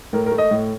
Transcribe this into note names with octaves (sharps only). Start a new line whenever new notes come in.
A2 A#4
A#4
A3
D#5
A2